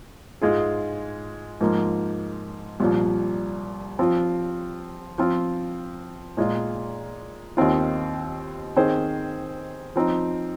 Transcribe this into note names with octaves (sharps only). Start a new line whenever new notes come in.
G#2 G#3 F4 G#4
G#2 F3 A#3
C2 A#2 F3
F3 C4 F4
F3 C4 F4
A#2 G#3 F4
D#2 D#3 C4 F4
D#3 C4 G#4 C5
F3 C4 D#4